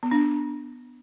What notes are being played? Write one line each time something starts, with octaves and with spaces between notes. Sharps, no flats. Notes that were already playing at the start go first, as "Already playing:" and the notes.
B3
D4